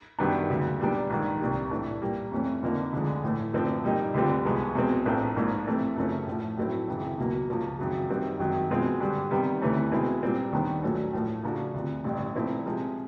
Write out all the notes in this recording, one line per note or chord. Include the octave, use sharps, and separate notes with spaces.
F#2 D#3 G3 B3 D4
D2 C#3 F#3
A#2 G3 B3 D4
A#1 G#2 D#3
C2 A#2 G3
A2 E3 A3 D4
A#2 G3 A#3
F2 C3 E3 A3 C#4
F2 D3 F3 A#3 D#4
D2 D3 F3 G#3
A2 E3 A3
F#2 D3 F3 A3 C4
A#2 G3 A#3 D#4 G4
D2 D3 G3 C4 F4
C2 C3 F3 G#3 B3
E2 B2 G#3 C4
A#1 A2 F3 A3 C4
A#1 G#2 F3 A#3
C3 E3 A3 C4
F#2 C#3 F3 A3 C#4
A2 F3 A3
A2 F#3 A3 C4 E4
G#1 F#2 C#3 E3 G#3
C#2 B2 F#3 A#3
C#2 C#3 F3 A#3
G#1 F#2 C#3 F#3
F#2 D#3 G3 C4
G#1 F#2 D#3 F#3
B2 G#3 C4 F4
G2 D3 G3
C3 D#3 G3 B3
D2 C3 E3 A3 C#4
B2 G#3 C4 E4
A#2 G3 C4 F4
D#2 D#3 G3 B3 D4
A#1 A#2 F#3 A3 C#4
A2 F3 A3
C#3 F3 A3 D4 F#4
D2 C3 F3
A1 G2 D3
A#2 F3 A3 C4 E4
C3 F3 G#3